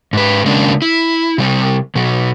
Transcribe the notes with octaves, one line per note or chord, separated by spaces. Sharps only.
G#2 B4
C#3 G#3 A#3 C#4 D4
E4
C3 G3
B2 F#3